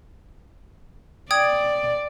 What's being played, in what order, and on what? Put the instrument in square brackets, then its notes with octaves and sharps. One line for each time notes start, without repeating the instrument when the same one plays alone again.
[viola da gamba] D5 [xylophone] G5 D#6 G#6